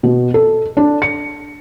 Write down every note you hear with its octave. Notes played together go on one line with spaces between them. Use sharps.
B2
A4
D4
C#7